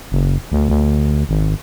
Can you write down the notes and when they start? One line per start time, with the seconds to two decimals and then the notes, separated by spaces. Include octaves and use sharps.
0.12 F#1
0.52 D2
0.69 D2
1.29 G#1